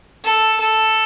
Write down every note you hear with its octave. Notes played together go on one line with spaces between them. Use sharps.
A4
A4